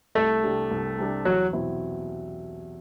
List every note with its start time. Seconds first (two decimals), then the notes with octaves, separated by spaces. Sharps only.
0.15 C2 A3
0.43 C3 G3 D4
0.71 C2
0.98 C3 G3 D4
1.25 E2 F#3
1.53 B2 F#3 C4 E4